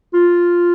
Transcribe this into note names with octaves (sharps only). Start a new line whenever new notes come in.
F4